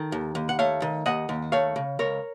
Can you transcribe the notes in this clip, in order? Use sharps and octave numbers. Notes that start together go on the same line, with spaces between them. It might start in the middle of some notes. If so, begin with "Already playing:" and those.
Already playing: D#3 A4
D#2
D#2
F#5
A3 C#5 F5
D#3
D#2 D#5 F#5
D#2
A3 C#5 F5
C#3
C#2 A#4 C#5